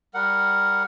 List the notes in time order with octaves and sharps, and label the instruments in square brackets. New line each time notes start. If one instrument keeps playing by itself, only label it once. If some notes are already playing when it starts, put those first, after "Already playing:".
[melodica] G3 A#4 F#5